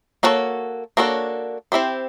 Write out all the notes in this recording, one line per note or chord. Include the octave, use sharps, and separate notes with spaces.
A#3 D4 F#4 A4 C#5
A#3 D4 F#4 A4 C#5
C4 E4 G4 C5